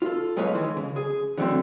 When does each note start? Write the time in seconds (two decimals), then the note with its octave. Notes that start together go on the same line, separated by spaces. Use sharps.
0.02 F4 A4
0.37 B1 G#3 B4 C#5 F5
0.54 D#3 E3 G#3
0.77 C#3
0.96 G#4
1.38 D3 E3 F#3 A3 A#3 C4